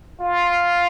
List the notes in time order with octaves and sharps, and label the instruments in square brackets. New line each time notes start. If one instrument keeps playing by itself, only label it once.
[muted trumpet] F4